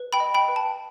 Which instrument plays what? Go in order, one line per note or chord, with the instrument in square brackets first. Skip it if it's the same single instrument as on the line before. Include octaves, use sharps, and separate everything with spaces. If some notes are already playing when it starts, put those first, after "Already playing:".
Already playing: [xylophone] B4
G5 B5
D#5
G5 B5
B4
A5